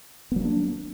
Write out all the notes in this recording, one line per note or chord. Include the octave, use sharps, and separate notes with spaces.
F#3 A#3 B3 D4